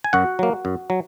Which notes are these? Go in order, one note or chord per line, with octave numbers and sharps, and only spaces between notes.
G#5
F#2 F#4 F#5
F#3 A#3
F#2
F#3